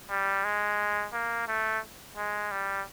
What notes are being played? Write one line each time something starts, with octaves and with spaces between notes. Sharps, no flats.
G3
G#3
A#3
A3
G#3
G3